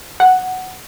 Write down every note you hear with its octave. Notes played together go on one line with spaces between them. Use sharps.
F#5